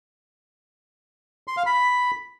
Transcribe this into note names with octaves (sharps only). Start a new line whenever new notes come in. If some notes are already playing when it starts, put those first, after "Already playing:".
C6
F5
B5